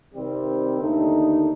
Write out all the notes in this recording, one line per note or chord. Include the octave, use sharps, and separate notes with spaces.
C3 D#3 G3 C4
D#2 D3 A3 D#4